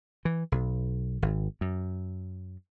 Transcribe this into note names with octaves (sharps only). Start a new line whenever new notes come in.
E3
B1
G#1
F#2